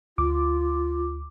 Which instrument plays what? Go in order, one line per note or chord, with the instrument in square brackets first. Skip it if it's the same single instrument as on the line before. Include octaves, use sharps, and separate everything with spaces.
[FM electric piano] D2 D6 [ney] F4